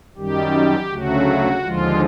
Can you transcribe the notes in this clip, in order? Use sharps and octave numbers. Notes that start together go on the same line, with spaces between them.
F#2 D#3 G3 G4
D2 C#3 F#3 A3 F#4
D#2 D3 F3 G#3 F4